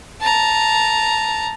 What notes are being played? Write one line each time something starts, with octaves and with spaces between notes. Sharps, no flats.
A5 A#5